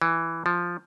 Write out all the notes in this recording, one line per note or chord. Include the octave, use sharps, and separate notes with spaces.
E3
F3